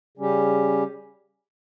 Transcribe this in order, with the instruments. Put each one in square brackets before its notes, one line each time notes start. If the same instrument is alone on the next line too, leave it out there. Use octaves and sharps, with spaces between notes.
[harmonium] C#3 G3 C#4 G4